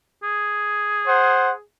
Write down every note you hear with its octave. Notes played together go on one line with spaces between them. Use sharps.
G#4
C5 F#5